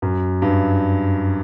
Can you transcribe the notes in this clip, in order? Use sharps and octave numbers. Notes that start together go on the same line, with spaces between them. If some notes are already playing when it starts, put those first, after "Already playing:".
F#2
G2